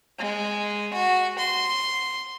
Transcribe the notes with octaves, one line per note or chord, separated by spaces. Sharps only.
G#3
F#4
C6